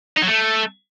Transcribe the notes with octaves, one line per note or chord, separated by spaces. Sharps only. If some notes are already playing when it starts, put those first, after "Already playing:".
D#4
F#3
A3